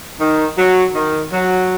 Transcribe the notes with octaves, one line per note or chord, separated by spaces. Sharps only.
D#3
F#3
D#3
F#3